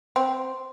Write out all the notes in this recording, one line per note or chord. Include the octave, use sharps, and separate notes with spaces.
C4